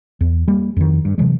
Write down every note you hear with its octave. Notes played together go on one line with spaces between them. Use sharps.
E2
G3 A#3
F2 D#3
G2
C3 E3 F#3 G#3